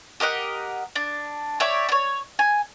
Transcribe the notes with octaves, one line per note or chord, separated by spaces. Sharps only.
G4 A#4 D#5 F#5
D4
C#5 D5 E5 G5
C#5 D5
G#5